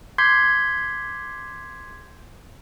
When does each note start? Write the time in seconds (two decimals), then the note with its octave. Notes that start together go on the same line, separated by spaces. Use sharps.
0.18 C6 D6 G6 G#6 B6 C7